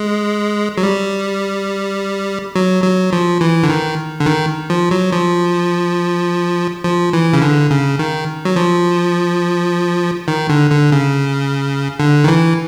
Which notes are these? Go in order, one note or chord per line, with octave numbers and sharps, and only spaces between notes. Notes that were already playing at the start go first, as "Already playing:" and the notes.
Already playing: G#3
F#3
G3
F#3
F#3
F3
E3
D3
D#3
D3
D#3
F3
F#3
F3
F3
E3
C#3
D3
C#3
D#3
F#3
F3
D#3
D3
D3
C#3
D3
D#3
E3